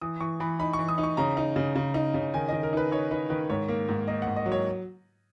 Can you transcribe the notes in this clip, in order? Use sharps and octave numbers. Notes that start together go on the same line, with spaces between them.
E3 D#6
E3 C#6
E3 B5
D#4 B5
C#6
E3
D#6
D#4
C#6
C#3 A#5
D#4
C#3
C#3
D#4
C#3
D#3 G#5
D#3 D#5
A#4
D#4 B4
D#4 C#5
D#4 B4
D#3 B4
G#2 C#5
A#3
G#2
A#3 D#5
G#2 F#5
D#5
F#3
C#5